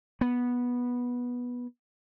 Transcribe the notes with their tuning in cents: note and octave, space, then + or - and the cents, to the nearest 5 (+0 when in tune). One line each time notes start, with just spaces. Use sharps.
B3 -10